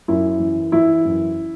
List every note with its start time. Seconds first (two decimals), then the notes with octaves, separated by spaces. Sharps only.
0.08 F#2 E4
0.40 E3
0.72 E3 E4
1.05 F#2